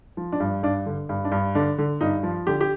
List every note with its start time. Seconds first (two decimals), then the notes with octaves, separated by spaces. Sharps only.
0.17 F3
0.32 D4
0.40 G2
0.63 G2 D4
0.86 D3
1.09 G2
1.25 D4
1.32 G2
1.55 D3 D4
1.78 D3
2.01 G2 D#4
2.23 F3
2.47 D3 G4
2.61 G4